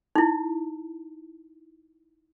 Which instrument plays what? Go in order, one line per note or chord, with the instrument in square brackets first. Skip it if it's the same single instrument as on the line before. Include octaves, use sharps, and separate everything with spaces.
[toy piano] D#4 E4